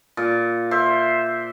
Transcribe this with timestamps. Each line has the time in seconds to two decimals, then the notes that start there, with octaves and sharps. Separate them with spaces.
0.17 A#2
0.71 C5 E5